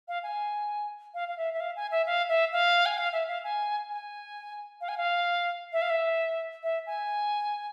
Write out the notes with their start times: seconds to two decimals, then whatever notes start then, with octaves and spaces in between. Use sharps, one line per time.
0.08 F5
0.23 G#5
1.14 F5
1.28 F5
1.37 E5
1.53 E5
1.60 F5
1.76 G#5
1.91 E5
2.06 F5
2.29 E5
2.53 F5
2.86 G#5
2.98 F5
3.13 E5
3.28 F5
3.44 G#5
3.90 G#5
4.81 F5
4.89 G#5
4.98 F5
5.73 E5
5.82 F5
5.90 E5
6.63 E5
6.86 G#5